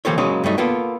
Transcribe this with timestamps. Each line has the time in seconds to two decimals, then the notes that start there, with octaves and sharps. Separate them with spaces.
0.05 E3 F3 A#3 G4 A4 C#5
0.18 C#3 F#3 G#3 A#3 C#4
0.44 G2 F#3 A3 D#4
0.58 A#3 B3 F4 A4